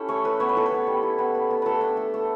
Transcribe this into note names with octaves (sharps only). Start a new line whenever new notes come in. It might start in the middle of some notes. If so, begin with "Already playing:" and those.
Already playing: C#4 E4 G4 A4
A3 C#5
A3 B4
B3 C#5
B4
E4 A4
B4
B3
G3
E4
B3
B3
B3
A3 A4 B4
D4
A3
A3